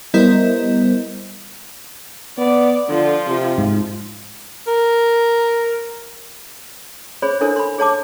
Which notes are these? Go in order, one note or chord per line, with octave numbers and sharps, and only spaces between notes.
G3 B3 E4 A#4 C5 D#5
B3 D5
D3 F3 F4
C3
G#2
A#4
G#4 C5 C#5 B5
D4 E4 A4 A#4 C5 C#5
B5 C6
G#4 C#5 A5 D6